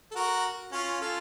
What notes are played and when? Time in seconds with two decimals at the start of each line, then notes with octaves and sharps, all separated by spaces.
0.11 A4
0.15 F#4 A#4
0.72 C#4 F4
1.01 F4 A4